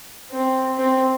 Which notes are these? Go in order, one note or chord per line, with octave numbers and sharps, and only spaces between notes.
C4
C4